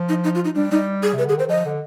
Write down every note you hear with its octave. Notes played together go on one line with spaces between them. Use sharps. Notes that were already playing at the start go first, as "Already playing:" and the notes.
Already playing: F3
D#4
D#4
F4
D#4
G3 D4
G3 D#4
G#4
C3 B4
D3 G#4
D#3 C5
F3 D#5
D3